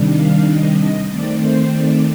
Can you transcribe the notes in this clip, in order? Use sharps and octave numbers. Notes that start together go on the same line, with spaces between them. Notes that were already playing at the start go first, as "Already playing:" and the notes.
Already playing: C3 D#3 G3 D4
F5
D#5
D#5
D#3 A3 C4 D5
C5
D5